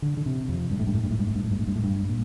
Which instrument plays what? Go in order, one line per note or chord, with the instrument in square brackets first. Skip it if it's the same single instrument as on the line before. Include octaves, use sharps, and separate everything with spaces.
[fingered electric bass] D3
D3
C3
F2
G2
A2
G2
A2
G2
A2
G2
A2
G2
A2
G2
A2
G2
A2
G2
A#2